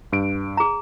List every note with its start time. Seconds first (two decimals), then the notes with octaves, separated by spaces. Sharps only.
0.12 G2 D7
0.57 G#4 A#5